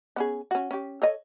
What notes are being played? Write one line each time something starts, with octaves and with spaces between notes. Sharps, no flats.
B3 C#4 G#4
C#4 F#4
C#4 G4
A4 C#5 D#5